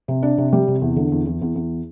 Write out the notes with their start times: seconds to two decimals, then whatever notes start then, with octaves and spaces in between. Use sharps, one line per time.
0.08 C3
0.23 D4
0.38 C3
0.53 G3
0.68 C3
0.81 E2
0.96 D3
1.12 E2
1.26 E2
1.42 E2
1.55 E2